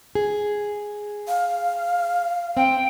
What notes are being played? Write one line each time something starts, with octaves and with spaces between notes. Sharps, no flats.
G#4
F5
C4 G5